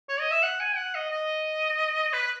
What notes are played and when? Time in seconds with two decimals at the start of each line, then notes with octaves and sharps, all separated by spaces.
0.09 C#5
0.20 D#5
0.31 E5
0.43 F#5
0.60 G#5
0.77 F#5
0.95 D#5
1.11 D#5
2.13 B4